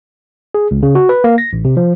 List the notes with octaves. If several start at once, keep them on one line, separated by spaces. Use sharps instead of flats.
G#4
C#2
C#3
F#4
B4
A#3
A#6
A1
C3
F3